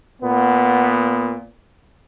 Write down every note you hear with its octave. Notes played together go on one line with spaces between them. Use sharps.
A#2 B3